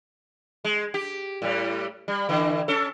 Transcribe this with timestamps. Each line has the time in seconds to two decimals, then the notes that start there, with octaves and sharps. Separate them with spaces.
0.65 G#3
0.94 G4
1.42 A2 G3
2.08 G3
2.29 D3 E3
2.68 C#4 A4